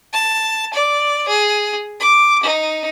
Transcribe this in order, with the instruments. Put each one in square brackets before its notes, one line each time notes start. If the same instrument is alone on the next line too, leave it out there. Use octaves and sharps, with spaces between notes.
[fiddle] A5
D5
G#4
D6
D#4